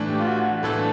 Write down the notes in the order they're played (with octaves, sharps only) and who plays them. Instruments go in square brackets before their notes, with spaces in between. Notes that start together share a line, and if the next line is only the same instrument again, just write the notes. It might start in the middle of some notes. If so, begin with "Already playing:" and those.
Already playing: [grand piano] A2 E3 A3 D4
[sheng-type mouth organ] G4
F4
F#4
[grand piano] A2 E3 A3 D4 [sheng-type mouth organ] A4